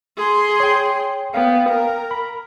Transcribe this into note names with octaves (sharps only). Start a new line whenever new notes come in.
G#4 C6
C#5 G5
B3 F5 G5
A#4
B5